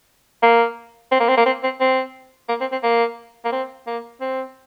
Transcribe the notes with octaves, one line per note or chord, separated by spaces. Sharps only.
A#3
C4
A#3
C4
A#3
C4
C4
C4
A#3
C4
C4
A#3
A#3
C4
A#3
C4